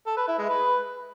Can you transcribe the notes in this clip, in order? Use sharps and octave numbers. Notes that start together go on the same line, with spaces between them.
A4
B4
E4
G#3
B4